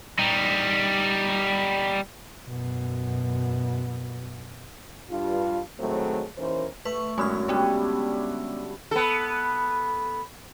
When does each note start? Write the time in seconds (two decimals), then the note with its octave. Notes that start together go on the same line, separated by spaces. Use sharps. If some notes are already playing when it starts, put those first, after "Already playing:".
0.19 G3 D#4
2.46 F#2 B2
5.10 G2 F4
5.79 A2 D#3 F#3 G#3 A3 C4
6.38 D#2 E3 C#4 A#4 C5
6.85 A3 B4 C#6
7.18 F#2 D3 G#3 B3 E4 F6
7.48 G3 G#3 B3 C#4 D4
8.91 B3 A4